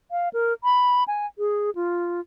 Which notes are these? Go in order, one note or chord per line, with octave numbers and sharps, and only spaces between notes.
F5
A#4
B5
G#5
G#4
F4